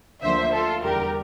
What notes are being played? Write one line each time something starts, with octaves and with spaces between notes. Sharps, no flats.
D2 D3 F3 A#3 D4 C5 E5
F4 A4
E2 D3 G3 D4 G4 A#4